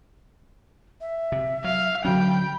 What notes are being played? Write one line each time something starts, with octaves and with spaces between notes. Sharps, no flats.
E5
C3
F#3 F5
D3 F#3 C#4 G5 B5